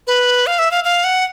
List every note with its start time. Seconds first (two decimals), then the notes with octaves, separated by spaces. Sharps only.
0.07 B4
0.47 F5
0.59 E5
0.71 F5
0.84 F5
1.04 F#5